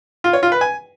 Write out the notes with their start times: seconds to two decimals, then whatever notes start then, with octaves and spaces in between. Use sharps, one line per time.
0.24 F4
0.33 C#5
0.43 F4
0.52 B4
0.61 G#5